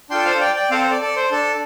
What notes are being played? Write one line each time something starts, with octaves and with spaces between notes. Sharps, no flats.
D4 F4 A4 G5 C6
C5 F5
D5 G5
D5 G5
C4 A4 C5 F5
C5
A4 D5
A4 D5
C5
D4 A4